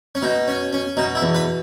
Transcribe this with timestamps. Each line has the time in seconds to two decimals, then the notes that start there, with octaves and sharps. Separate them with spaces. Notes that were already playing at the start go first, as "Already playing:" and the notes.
0.15 C#4
0.22 B2 D#4
0.48 C#4
0.73 C#4
0.97 B2 D#4
1.15 E4
1.21 E2
1.35 B4